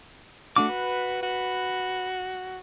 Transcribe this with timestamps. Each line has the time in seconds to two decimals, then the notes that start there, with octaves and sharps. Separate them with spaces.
0.56 A3 D4 F#4 D6
0.69 B4
1.22 F#4